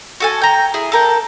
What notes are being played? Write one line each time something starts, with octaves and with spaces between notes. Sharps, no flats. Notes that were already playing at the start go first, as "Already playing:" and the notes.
F#4 A4 G#5
G5 A#5
E4 G#4
A4 A#4 G5